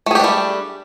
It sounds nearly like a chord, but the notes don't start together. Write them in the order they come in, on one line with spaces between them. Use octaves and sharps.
A3 G#4 G4 D4 G3